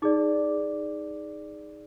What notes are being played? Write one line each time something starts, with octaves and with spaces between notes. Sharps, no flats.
D#4 G#4 D5 D6